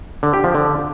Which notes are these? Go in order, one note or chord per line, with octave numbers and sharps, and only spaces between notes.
D3
G4
F3
D3